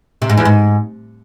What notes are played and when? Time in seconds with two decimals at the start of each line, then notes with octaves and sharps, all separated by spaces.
0.22 C3
0.30 G#2
0.37 E2
0.45 G#2